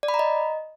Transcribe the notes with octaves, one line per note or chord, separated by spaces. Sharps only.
D5
B5
A#5
D#5